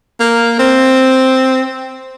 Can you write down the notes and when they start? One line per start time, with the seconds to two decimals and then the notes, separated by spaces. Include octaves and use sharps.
0.20 A#3
0.59 C4